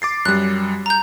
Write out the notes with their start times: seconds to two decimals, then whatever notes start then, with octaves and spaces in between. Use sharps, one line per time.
0.02 D6 A6 C7
0.25 F#2 G3 F#6
0.86 A#5 G6